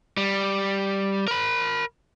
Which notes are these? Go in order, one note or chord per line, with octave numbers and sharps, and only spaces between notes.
G3
A#4 B5